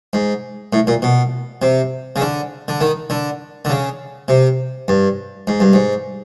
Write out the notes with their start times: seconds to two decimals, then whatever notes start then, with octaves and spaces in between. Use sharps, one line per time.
0.13 G#2
0.73 A2
0.87 A#2
1.02 B2
1.62 C3
2.16 C#3
2.21 D3
2.68 D3
2.81 D#3
3.10 D3
3.65 D3
3.69 C#3
4.28 C3
4.88 G2
5.47 G#2
5.60 G2
5.73 G#2